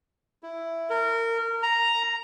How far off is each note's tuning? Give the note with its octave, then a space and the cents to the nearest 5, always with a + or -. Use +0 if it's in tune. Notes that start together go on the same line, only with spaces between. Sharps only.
E4 +5
A#4 -25
A#5 +0